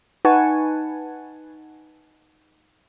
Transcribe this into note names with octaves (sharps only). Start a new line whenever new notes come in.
D#4 B4 F#5 G#5 A5 C#6